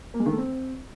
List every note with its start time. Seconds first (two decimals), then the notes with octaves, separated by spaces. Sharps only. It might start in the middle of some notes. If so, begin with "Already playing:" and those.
0.14 A#3
0.20 G#3
0.26 D#3
0.32 A3
0.38 C4